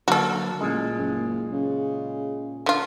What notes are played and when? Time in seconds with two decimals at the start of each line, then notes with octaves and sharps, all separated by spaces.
0.08 D3 F#3 A#3 F#4 A4
0.61 A1 A#2 G#3
0.98 F#1
1.52 C#3
2.66 D3 F4